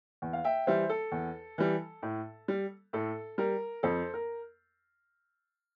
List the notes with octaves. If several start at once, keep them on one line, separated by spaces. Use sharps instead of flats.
E2
F5
E5 G5
E3 G3 C5 E5
A4
E2
E3 G3
A2
G3
A2 A4
G3 A#4
F2 A4 C5
A#4